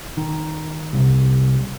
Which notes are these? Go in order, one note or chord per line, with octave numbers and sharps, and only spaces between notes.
D#3
C2